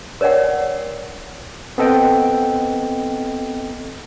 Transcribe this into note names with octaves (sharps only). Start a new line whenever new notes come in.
A#4 C#5 D5 F#5 G5
B3 C4 A4 D#5 F#5 G5